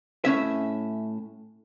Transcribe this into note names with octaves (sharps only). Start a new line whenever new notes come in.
A2 C#4 E5